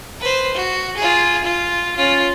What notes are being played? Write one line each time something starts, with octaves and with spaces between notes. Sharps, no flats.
B4 C5
F#4
F4 G#4
F4
C#4 F4